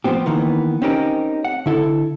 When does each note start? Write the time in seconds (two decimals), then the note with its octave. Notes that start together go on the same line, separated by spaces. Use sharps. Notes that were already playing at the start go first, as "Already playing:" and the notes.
0.04 F3 F#3 B3 C4 G4
0.26 D#3 E3 A#3 B3
0.82 C4 C#4 D#4 G4 A#4
1.45 F#5
1.66 D3 E4 A4